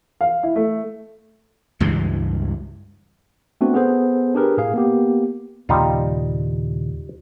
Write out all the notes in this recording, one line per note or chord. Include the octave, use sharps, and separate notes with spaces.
F5
E4
A3
C#2 G2 E3 G#3
A3 B3 C4 D4 F#4
B3 G#4 A4 C5
D4 G4 G#4 A#4 B4
A2 G#4 F5
A#3 B3 G4
D#2 A#2 C#3 G3 D#4 F4